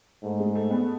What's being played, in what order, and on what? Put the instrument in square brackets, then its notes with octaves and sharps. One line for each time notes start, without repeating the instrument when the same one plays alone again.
[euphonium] G#2 [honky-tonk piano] A3
[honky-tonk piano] G#3
A3
B3